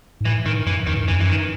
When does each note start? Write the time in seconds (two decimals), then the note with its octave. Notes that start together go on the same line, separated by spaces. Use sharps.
0.21 G#2
0.25 A2 E3
0.45 G#2 D#3
0.66 F#2 E3
0.87 E2 D#3
0.97 G#2
1.07 F#2 E3
1.20 E3
1.29 D#3